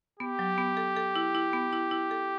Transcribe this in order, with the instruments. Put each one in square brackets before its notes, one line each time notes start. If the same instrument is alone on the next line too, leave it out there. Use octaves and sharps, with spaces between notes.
[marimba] B3 [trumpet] G4
[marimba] F#3
B3
A4
A4
E4
E4
B3
E4
E4
A4